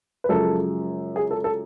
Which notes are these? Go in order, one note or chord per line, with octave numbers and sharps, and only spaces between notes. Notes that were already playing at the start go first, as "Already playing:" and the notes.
B4
F#2 C#3 F3 G#3 A4
G#4
A4
A4